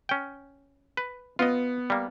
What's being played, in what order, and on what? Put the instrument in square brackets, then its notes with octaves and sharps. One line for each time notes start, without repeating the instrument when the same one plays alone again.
[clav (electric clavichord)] C#4 G5
B4
[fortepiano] B3 [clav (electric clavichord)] F4 D#5
[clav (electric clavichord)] G3 A#3